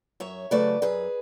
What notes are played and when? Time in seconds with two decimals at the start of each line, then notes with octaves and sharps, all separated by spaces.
0.20 F#2 C#5 E5
0.51 C#3 F#3 A3 B4 D5
0.82 F#2 G#4 B4